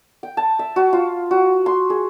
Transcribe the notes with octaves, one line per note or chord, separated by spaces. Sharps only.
G5
A5
E5
F#4
F4
F#4
C6
G#4